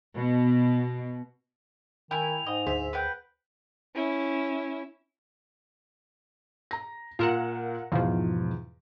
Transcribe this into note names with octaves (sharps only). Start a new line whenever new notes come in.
B2
D#3 E4 G5 G#5 F7
G#2 D#5
D2 G#4 C5 E5
B4 F#5 G5
C#4 E4
A#5 A#6
A#2 F4 A#4 F#5 E7
E2 G#2 B2 F3 F4 F5